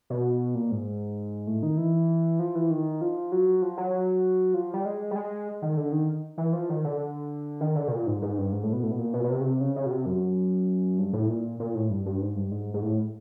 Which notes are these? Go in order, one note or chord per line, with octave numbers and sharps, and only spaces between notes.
B2
A#2
G#2
A2
D#3
E3
F3
E3
D#3
F3
F#3
F3
F#3
F3
G3
G#3
G3
G#3
D#3
D3
D#3
E3
F3
D#3
D3
D#3
D3
B2
A#2
G#2
G#2
G2
G#2
A2
B2
A2
B2
A#2
B2
B2
C3
C#3
C3
C#3
C#3
B2
C3
F#2
G2
A2
A#2
A#2
A2
G2
G2
G#2
G2
G#2
G#2
A2